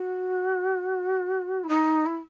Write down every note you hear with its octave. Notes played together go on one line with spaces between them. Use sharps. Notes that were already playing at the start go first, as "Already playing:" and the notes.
Already playing: F#4
E4
D#4
E4